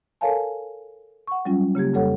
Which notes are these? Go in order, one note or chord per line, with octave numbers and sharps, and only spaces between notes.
A4 A#4 C#5 F5 G#5 A5
F#5 C#6
F#3 G3 C#4 F4
C#3 A#3 G4 G#6
F2 C#3 G3 A4 C#5 F#5